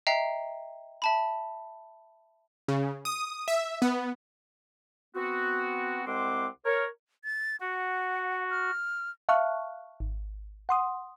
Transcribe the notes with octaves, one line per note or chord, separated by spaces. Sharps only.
D#5 E5 G5 A#5 C7
E5 A5 B5
C#3
D#6
E5
B3
B3 C4 F#4
C2 G#3 C4 F#5 C6 D6
A#4 C#5
A6
F#4 F#5
F6
E5 F5 A5 C#6 F6 F#6
G#1
F#5 C6 D#6